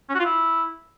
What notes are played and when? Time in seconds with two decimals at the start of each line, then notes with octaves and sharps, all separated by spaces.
0.09 C#4
0.15 F#4
0.20 F4
0.25 E4